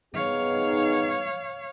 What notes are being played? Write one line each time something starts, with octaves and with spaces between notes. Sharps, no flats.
B3 D#4 G#4 C#5 F5